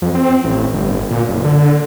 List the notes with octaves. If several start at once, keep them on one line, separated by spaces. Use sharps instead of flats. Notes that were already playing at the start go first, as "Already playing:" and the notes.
F2
C4
A1
G1
A#2
F#1
D3